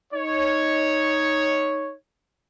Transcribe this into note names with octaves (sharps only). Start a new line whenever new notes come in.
D#4 C#5